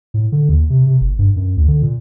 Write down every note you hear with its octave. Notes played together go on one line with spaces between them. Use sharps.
A2
D3
D#2
C3
C3
F#1
G2
F#2
D2
D3
A#2